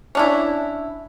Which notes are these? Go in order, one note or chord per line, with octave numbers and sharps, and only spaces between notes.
C#4 D4 E4